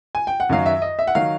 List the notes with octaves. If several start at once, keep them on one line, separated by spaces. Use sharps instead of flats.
G#5
G5
F#5
F#2 D#3 F#3 F5
E5
D#5
E5
F#5
D#3 F#3 F5